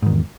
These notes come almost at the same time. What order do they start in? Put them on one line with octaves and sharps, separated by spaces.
G#2 D#3 E2